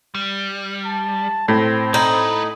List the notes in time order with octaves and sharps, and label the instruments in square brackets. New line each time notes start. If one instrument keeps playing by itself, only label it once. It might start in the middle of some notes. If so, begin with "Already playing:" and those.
[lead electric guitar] G3
[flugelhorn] A5
[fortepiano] A2 [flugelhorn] C4
[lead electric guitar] A#3 B4 [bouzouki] D#4